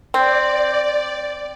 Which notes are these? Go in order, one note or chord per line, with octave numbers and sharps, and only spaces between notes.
C4 D5